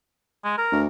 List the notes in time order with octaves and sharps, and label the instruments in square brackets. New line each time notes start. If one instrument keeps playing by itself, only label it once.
[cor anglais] G#3
A#4
[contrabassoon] D2